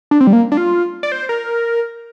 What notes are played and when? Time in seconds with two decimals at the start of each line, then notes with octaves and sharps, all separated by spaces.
0.11 D4
0.20 C4
0.27 G3
0.33 A#3
0.52 D4
0.57 F4
1.03 D5
1.12 C5
1.29 A#4